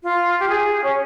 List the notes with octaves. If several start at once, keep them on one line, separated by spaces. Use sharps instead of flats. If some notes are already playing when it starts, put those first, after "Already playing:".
F4
G4
G#4
C#4